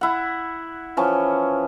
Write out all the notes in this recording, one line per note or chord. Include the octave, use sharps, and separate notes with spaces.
E4 F#5
E3 F3 C#4